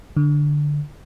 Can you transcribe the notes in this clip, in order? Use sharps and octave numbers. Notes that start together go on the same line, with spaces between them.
D3